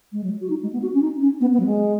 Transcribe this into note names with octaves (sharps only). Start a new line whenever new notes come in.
G#3
F#3
F#4
D#4
G#3
B3
F#4
C#4
D#4
C#4
B3
B3
F#3
G#3